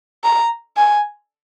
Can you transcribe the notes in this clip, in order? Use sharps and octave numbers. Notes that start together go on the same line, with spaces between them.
A#5
G#5